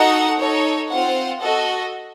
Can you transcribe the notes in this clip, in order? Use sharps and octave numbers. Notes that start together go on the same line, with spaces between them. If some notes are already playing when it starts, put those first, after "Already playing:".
Already playing: D#4 F#4 A4 D#5 F#5
D#4 A4 C#5
C4 F4 C5 F#5
F#4 A4 D#5